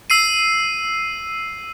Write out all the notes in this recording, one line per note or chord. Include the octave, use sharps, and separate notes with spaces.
E6 C7 D#7